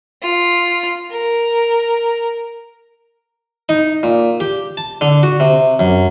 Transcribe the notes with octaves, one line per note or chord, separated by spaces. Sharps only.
F4
A#4
D#4
A#2
G4
A5
D3
F#4
C3
F#2